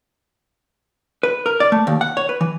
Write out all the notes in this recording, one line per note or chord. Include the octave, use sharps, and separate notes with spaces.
B4
A#4
D5
A3
D#2
F#5
C#5
B4
E3